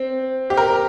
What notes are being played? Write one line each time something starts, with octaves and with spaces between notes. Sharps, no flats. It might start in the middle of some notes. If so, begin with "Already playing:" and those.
Already playing: C4
G4
A#4